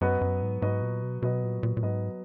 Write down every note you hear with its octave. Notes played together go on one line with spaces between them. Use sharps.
F#2 F#3 B3 F#4 B4 D#5
F#2
G#2
G#2 F#3 B3 F#4 B4 D#5
A#2
B2
B2 F#3 B3 F#4 B4 D#5
A#2
A#2
A#2
G#2 F#3 B3 F#4 B4 D#5